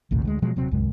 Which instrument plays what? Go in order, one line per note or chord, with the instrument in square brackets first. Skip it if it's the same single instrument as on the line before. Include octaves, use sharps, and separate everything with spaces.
[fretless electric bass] A#1 D#2 A2 C3
D2 G#3
B2 F3 F#3 G#3
D#1 C3 F#3 C4
D1 C2 F#2 G#3